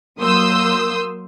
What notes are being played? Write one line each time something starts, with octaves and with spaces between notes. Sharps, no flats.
F#3 A#3 C6 D#6 E6 G6